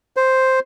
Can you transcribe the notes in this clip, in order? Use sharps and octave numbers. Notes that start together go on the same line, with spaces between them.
C5